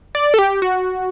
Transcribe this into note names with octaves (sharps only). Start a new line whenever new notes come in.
D5
A4
G4
F#4